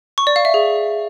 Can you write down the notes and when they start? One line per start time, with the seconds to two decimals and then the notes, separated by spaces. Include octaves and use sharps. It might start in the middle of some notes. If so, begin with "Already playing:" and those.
0.18 C#6
0.27 D5
0.36 F5
0.45 E5
0.54 G#4